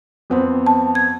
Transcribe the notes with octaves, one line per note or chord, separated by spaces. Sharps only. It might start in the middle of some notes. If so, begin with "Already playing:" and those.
F2 B3 C4
A5
G#6